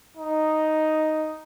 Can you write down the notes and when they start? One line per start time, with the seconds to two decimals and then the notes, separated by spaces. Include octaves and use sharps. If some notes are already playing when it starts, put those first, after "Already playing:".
0.17 D#4